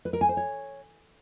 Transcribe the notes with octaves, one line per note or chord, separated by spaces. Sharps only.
B4
A#4
G#5
C5
C#5